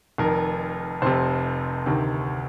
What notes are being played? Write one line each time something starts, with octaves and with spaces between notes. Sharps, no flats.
F1 F2 D#3 A#4
F1 F2 C3 C5
D2 C3 D#3